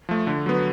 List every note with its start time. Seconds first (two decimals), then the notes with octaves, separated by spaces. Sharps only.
0.09 F3 A3
0.27 D3
0.46 F#3 B3